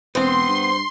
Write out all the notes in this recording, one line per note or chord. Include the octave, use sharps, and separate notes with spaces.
E1 B3 C4 C5 C6
G2